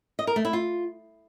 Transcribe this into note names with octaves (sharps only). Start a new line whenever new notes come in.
D#5
A#4
A3
E4
F4